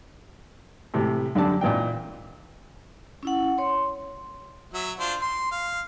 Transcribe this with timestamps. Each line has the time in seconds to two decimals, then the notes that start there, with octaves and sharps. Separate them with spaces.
0.94 A2 C3 E3 A3
1.35 F#2 D3 G3 D5 A5
1.61 A#2 E3 D#4 G5
3.23 C#4 E4 F#5
3.58 C#5 C6
4.74 F#3 E5
5.00 D4 F4 C5
5.22 C6
5.52 F5